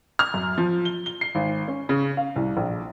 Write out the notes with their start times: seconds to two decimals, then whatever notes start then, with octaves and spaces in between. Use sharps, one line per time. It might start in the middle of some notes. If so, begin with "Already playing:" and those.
0.19 F6
0.34 F#2
0.58 F3
0.85 G7
1.06 G7
1.21 C7
1.35 G#1
1.68 C#4
1.89 C#3
2.17 F5
2.36 C2
2.57 A#1